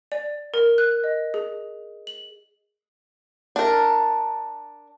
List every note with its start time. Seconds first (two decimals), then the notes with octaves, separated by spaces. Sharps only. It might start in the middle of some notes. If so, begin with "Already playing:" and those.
0.12 D5
0.54 A#4
0.78 F#6
1.04 D#5
1.34 G#4
2.07 F#7
3.56 D4 A#4